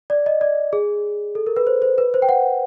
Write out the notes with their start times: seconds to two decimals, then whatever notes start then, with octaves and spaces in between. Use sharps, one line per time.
0.10 D5
0.26 D#5
0.41 D5
0.73 G#4
1.35 A4
1.47 A#4
1.56 B4
1.67 C5
1.82 C5
1.98 B4
2.14 C5
2.22 G5
2.29 F#5